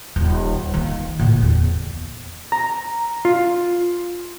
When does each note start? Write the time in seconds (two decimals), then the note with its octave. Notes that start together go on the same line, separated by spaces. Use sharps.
0.16 D#1
0.74 D#3 A#3
1.20 D2 A#2
1.42 E2
2.52 A#5
3.25 F4